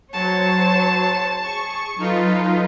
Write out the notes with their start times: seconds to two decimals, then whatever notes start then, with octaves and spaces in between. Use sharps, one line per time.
0.14 F#3 C5 C#5 A5
1.43 G#4 C#6
1.99 F#3 D#4 F4 A4 B4